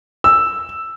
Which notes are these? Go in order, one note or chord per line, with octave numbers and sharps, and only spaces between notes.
E6